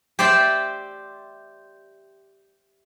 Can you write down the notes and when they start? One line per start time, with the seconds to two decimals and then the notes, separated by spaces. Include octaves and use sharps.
0.19 G4 C5 D5 E5 G5